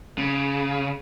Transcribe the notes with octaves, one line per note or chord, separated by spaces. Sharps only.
C#3